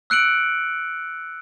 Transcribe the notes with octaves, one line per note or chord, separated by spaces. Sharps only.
E6 F#6 C#7 D7 F#7